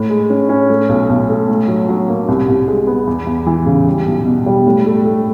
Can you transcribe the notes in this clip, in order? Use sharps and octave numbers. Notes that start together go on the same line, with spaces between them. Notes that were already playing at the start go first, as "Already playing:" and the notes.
Already playing: A2
G#3
C#4
C#4
A3
B1
B1
A3
A2
F#3
F#3
A#3
C2
C2
G#3
B3
E2
E2
E3
C#3
G3
B1
B2
G3
A2
A3
A3